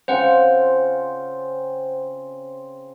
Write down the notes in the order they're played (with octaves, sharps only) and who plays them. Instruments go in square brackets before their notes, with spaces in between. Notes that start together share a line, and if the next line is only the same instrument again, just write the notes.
[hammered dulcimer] C#3 C4 F4 [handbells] C5 F#5